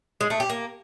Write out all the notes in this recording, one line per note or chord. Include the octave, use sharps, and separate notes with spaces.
G#3
A3
G4
A#3